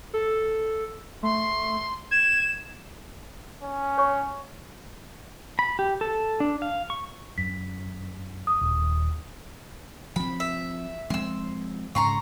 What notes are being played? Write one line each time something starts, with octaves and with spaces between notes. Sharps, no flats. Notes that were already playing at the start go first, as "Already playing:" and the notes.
A4
A3 C6
G#6 E7
C#4
C#5 F#5 C#6
B5
G4
A4
D4
F5
C#6
F#2 B6
D#6
D#1
F3 C4 B5
E5
F3 G#3 C4 C6 E6
G#2 C#3 A#5 C6 C#6